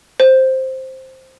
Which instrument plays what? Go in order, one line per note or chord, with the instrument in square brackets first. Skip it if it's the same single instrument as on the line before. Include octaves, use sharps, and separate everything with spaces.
[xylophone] C5